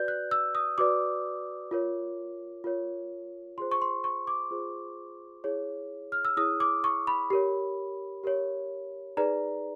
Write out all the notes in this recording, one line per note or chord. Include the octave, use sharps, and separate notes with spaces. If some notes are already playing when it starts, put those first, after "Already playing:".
Already playing: F#4 B4 D5 G6
F#6
E6
D#6
F#4 B4 D5 D6
F4 A#4 C#5
F4 A#4 C#5
F4 G#4 C5 C6
C#6
C6
C#6
D6
F4 G#4 C5
E4 G#4 C#5
F6
E6
E4 G#4 C#5 D#6
D6
C#6
B5
G4 A#4 C#5
G4 A#4 C#5
D#4 G#4 B4 D5 A#5